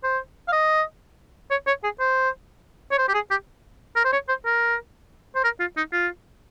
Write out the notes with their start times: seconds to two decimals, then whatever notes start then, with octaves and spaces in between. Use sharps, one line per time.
0.03 C5
0.48 F5
0.52 D#5
1.51 C#5
1.67 C#5
1.84 G#4
2.00 C5
2.91 C#5
2.98 C5
3.08 G4
3.14 G#4
3.30 G4
3.96 A#4
4.05 C5
4.13 C#5
4.29 C5
4.45 A#4
5.35 C5
5.44 A#4
5.60 F4
5.77 D#4
5.93 F4